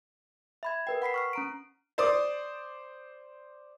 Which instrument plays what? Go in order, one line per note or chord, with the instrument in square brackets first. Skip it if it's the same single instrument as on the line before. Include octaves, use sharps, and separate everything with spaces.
[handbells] E5 B5 G#6
A#4 B4 G5
F#5 B5 B6 C7
C#6 F6 C7
C#4 A#5 D7
[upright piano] C5 D5 D6 D#6